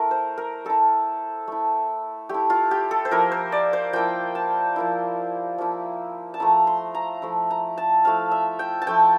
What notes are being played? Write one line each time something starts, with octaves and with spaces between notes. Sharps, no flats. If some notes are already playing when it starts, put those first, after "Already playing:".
Already playing: A3 E4 A#4
C5
A#4
A3 E4 A4
A3 E4
A3 E4 G4
F4
G4
A4
C5
F3 A#3 E4 A#4
C5
D5
C5
F3 A#3 E4 G5
A5
F3 A#3 E4
F3 A#3 E4
A5
F3 A3 E4 A#5
C6
A#5
F3 A3 E4
A#5
A5
F3 A3 E4 F5
E5
G5
A5
F3 A3 E4 G5